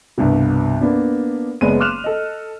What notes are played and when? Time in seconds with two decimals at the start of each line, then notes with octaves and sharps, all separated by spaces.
0.18 C2 G2 B2
0.81 A#3 B3 D4
1.61 F#1 G#3 B3 D5 D#7
1.80 C6 D6 F6 F#6 E7 F7
2.04 A4 D#5